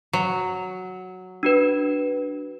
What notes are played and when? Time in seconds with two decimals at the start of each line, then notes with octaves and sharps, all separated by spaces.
0.13 F#3
1.43 D4 F#4 B4